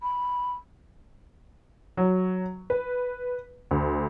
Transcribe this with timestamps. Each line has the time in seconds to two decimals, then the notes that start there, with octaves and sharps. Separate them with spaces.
0.02 B5
1.97 F#3
2.70 B4
3.71 D2